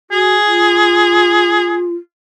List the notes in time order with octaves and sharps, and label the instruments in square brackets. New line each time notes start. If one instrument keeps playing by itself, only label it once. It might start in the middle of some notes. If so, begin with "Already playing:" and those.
[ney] F#4 [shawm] G#4
[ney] F4